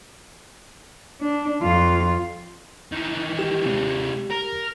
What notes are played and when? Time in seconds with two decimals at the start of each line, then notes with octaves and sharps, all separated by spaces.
1.21 D4
1.61 F2 F4
2.92 D#3 E3
3.39 G4
3.66 C3 G#3
4.31 A#4